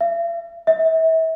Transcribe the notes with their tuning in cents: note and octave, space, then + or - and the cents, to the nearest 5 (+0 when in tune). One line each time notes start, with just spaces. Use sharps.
E5 +45
E5 -35